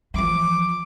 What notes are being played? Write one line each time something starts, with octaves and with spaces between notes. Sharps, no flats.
E3 F3 D6